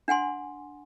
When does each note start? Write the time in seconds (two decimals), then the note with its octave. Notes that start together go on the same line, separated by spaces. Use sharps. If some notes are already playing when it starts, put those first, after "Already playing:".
0.08 D4 F#5 G#5 C6